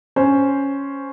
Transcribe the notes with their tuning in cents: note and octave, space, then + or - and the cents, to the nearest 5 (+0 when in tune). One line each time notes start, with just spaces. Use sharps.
C#4 +0 C5 +0